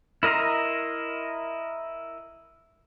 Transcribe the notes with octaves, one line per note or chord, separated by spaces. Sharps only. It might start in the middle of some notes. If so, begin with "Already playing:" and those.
E4 A#4 D#5 A#5 C6